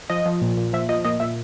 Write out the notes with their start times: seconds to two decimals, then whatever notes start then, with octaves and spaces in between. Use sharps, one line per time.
0.10 F3 D#5
0.26 F3
0.42 A#2
0.57 A#2
0.73 F3 E5
0.89 F3 D#5
1.05 A#2 D#5
1.20 A#2 E5